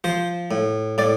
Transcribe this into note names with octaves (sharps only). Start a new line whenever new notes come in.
F3 C5
A2
A2 D5